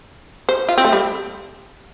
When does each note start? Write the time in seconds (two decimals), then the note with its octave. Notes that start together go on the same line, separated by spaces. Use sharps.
0.49 C5
0.69 F4
0.78 C4
0.85 A3
0.92 G3